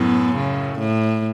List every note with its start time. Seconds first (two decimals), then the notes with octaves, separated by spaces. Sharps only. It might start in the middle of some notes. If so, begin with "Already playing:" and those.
Already playing: F#2 A2 B3
0.36 C#3
0.79 A2